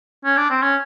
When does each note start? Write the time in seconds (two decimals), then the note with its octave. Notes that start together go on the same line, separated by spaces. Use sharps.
0.25 C#4
0.37 D4
0.50 C4
0.63 C#4